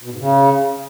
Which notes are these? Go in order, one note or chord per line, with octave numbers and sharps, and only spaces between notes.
B2
G#2
C#3